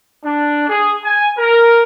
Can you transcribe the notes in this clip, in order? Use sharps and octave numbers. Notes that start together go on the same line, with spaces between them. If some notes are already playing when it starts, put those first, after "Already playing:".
D4
G#4
G#5
A#4